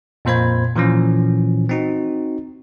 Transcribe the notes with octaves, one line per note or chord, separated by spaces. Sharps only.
F2 A#2 A#3 C5 B5 G#6
A#2 E3 F3 C#4
C4 D#4 F#4